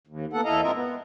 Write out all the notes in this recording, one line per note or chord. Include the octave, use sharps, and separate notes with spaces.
D#2
A#3 B3 A4 F#5
E2 E4 A4 D#5 F5 A#5
G#2 C4 F4 A#4 D#5 E5
B3